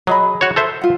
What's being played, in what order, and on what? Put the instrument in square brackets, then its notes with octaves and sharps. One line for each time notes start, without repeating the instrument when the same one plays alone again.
[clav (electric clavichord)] F#3 [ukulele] G#4 D#5 B5
[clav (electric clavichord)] F#4 C#5
A4 C5 E5
[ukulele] F4 F#5